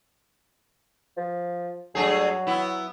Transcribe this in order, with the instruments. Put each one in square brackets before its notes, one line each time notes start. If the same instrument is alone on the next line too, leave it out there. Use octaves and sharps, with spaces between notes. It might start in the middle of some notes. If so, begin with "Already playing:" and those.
[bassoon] F3
[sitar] G2 A3 G#4 [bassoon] F#3
[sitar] B3 E4